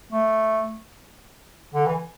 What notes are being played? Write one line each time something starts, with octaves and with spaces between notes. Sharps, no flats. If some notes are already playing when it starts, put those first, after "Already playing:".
A3
D3
E3